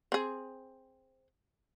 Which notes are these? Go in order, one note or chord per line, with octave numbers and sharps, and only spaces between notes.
C4 G#4